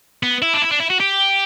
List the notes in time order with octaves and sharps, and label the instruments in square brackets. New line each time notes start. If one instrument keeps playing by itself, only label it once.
[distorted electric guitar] B3
E4
D4
E4
D4
E4
F#4
G4